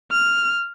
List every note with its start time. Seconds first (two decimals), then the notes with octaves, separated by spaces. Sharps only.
0.11 F6